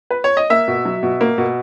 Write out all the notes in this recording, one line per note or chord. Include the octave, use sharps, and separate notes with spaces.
B4
C#5
D#5
A#3 E5
B2
F#3
B2
A#3
B2